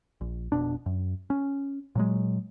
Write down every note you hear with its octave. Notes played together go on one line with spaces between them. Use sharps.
A#1
F1 B2 D4
F#2
C#4
A#2 F#3 G#3